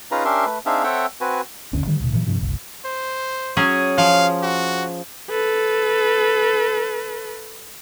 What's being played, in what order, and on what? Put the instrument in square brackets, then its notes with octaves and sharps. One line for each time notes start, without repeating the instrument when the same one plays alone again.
[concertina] C#4 D#4 F4 G#4 B4 A#5
C#4 D4 G4 A#4 E5 C6
A3 B4
C4 D4 D#4 G#4 E5 F5
C4 A4 C#5 E5 F#5 G5
C4 F#4 B4 G#5
[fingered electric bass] F#1 D2 C#4
D3 D#3 G3
D2 B2
A#2 E3 F#3
G2 C3 F3
F#1 C2
[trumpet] C5
[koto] F#3 C#4 G#4
[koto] F3 [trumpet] F5
[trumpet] F#4
[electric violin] A4 B4